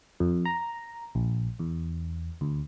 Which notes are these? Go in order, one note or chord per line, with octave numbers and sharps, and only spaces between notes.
F2
A#5
A#1
E2
D2